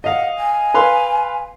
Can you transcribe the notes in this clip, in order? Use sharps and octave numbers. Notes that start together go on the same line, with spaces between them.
D#5 F5 F#5
G#5
B4 F5 C6